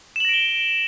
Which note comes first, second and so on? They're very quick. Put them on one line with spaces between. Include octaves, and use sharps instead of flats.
E7 F#7 A#6 D7 G7